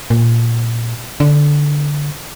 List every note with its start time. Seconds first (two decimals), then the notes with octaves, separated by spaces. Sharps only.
0.10 A#2
1.20 D3